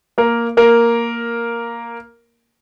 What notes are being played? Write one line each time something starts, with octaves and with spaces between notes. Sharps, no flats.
A#3 A#4
A#3 A#4